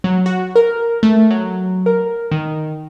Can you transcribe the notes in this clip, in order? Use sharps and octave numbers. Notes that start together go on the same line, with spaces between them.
F#3
F#4
A#4
A3
F#3
A#4
D#3